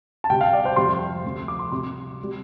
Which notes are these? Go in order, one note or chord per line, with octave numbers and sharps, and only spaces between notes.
A5
C2 C3 G3 G5
F5
D5
C5
F2 C3 G3 C6
D2 C3 F3
D6
C6
C2 C3 G3 C6
G3